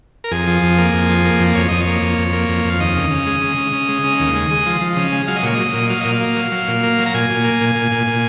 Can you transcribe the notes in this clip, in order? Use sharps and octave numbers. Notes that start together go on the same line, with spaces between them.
A#4
F2 G#4
F3
F2
A#3
F2
F3
A#3
F2
F2 C#5
F2 D#5
C#5
A#3
F2
F2
A#3
F2
F2
F5
D#2 D#5
C#3
C#3
G#3
C#3
C#3
C#3
G#3
C#3
D#2
G#3
G#3
F3
F3
C#3
G#3
F#3 F5
D#5
A#2 C#5
F#3 D#5
A#2
F#3 F5
A#2 D#5
F5
A#3
F#3
F#3
A#2
A#3
F#3
A#5
A#2 G#5
A#2
A#3
A#2
A#2
A#2
A#2